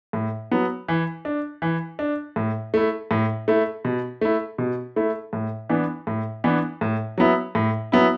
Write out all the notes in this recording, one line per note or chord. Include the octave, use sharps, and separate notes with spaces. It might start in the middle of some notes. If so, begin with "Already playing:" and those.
A2
F#3 B3
E3
D4
E3
D4
A2
A3 E4
A2
A3 E4
B2
A3 E4
B2
A3 E4
A2
E3 B3 D4
A2
E3 B3 D4
A2
F#3 B3 E4
A2
F#3 B3 E4